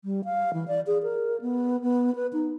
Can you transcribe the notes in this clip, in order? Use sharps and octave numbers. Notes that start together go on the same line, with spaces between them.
G3
F5
E3
D5
G#4
A#4
B3
B3
B4
D#4